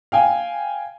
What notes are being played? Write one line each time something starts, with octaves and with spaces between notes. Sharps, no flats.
F5 G5 G#5